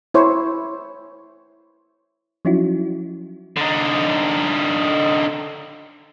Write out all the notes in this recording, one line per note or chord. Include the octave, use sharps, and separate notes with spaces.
E4 C5 C#5
F3 F#3 C#4 D#4 E4 F#4
D3 D#4